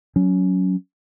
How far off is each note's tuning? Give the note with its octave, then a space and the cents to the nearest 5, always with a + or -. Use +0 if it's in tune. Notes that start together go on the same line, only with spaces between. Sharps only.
F#3 +0 C#4 +15